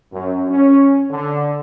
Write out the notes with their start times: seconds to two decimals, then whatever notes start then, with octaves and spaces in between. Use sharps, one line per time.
0.12 F#2
0.49 C#4
1.10 D3